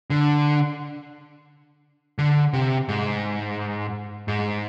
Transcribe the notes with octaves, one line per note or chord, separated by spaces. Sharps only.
D3
D3
C3
G#2
G#2